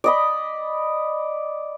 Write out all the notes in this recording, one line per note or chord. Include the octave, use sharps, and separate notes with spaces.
D5 D#5 B5